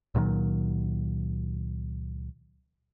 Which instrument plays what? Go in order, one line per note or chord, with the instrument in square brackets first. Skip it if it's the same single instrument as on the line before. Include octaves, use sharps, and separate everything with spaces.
[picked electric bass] C#2 A#2 D#3 F#3